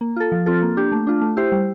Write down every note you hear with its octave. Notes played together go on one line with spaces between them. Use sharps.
A#3
F4 A4
F3
C4 F4 A4
A#3
D4 G4
A3
D4 F4
A3
E4 G4 C5
G3